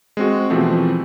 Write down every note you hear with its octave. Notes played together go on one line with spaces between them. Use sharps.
G#3 C4 F#4
B2 E3 F3 A3 C4